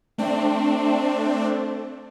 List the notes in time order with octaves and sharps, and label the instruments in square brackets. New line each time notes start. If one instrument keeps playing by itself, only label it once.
[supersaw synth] A3 C4 D4